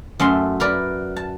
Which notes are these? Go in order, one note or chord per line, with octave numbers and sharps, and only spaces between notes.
F#2 A3 E5 C6
A#4 B4 D5
A5